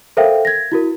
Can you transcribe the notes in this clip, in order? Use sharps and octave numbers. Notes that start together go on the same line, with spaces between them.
A4 A#4 C5 E5 F5 G5
G#6 A#6
E4 F#4 A#4